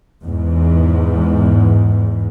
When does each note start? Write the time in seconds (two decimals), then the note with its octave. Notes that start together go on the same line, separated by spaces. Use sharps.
0.22 E2 G#2